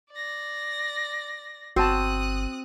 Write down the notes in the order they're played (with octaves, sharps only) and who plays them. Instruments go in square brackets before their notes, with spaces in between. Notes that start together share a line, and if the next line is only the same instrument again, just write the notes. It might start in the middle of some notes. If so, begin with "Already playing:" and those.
[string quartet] D5 A#6
[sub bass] G1 [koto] C4 [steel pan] F#4 A5 [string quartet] D#6 F#6